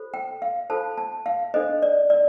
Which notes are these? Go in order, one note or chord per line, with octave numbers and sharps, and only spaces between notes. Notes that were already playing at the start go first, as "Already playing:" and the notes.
Already playing: F4 A4 C5
G5
F5
F4 A4 C5 A5
A5
F5
D4 A4 C5 D#5
D5
D5